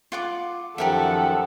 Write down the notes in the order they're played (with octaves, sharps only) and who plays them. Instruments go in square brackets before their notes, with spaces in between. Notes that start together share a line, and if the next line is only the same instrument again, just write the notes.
[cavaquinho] F4 F#5 D6
[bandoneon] F#2 D#3 F3 [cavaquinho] G4 A#4 E5 [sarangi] A4 [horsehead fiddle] F#5